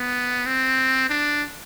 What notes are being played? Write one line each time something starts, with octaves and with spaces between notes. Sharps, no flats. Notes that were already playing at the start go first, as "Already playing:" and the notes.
Already playing: B3
C4
D4